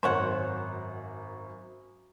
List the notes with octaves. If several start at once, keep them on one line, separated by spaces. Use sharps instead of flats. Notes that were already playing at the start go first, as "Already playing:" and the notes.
G#1 F#2 C5 C#5 F#5